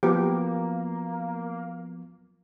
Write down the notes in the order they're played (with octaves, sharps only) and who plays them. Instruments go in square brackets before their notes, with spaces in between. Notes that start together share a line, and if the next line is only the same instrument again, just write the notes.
[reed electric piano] F3 F#3 B3 [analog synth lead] A#3 [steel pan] G4